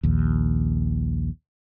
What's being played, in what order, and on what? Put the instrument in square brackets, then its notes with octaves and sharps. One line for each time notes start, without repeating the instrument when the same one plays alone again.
[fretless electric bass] A#1 D#2